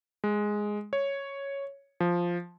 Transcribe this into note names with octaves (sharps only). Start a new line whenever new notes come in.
G#3
C#5
F3